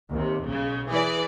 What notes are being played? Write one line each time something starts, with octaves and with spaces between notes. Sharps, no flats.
D#2 C3
B1 C#3
E3 G#4 B4 D5